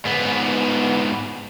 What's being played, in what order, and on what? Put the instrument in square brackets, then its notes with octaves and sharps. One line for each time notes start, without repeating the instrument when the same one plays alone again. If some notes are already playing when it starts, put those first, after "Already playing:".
[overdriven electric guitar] G#2 B3